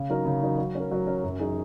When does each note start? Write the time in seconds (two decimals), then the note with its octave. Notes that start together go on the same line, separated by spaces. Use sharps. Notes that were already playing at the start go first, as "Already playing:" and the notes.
Already playing: C#3
0.10 F#3 D#4 A#4
0.25 C#3
0.42 F#3 D#4 A#4
0.58 F#3
0.75 C#4 A#4
0.91 F#3
1.07 C#4 A#4
1.24 F#2
1.39 F#3 D#4 G#4